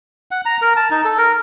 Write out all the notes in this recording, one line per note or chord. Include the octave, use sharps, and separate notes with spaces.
F#5
A#5
A#4
A5
D#4
A4
A#4